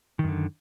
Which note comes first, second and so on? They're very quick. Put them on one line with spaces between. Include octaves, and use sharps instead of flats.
D#3 F#2 D3